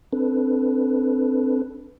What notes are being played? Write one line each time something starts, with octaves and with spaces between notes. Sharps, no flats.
C4 D4 A4 B4